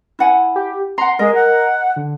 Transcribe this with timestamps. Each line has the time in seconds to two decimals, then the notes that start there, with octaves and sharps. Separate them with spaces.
0.19 E4 F#5 G#5
0.56 G4
0.98 F#5 A#5 C6
1.19 G#3 A#4 D#5
1.35 F#5
1.96 D3